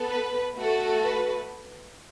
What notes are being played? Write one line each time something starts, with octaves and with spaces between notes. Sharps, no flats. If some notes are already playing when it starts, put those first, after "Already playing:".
Already playing: B3 A4
B4
A3 F#4 A4
B4